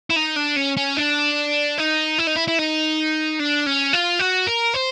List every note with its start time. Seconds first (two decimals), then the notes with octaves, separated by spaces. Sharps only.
0.10 E4
0.16 D#4
0.37 D4
0.57 C#4
0.77 C#4
0.97 D4
1.78 D#4
2.18 E4
2.27 D#4
2.36 E4
2.47 E4
2.59 D#4
3.39 D4
3.66 C#4
3.93 F4
4.19 F#4
4.47 A#4
4.74 C5